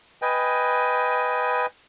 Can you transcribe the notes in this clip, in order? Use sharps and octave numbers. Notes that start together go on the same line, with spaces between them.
B4 D#5 G5 G#5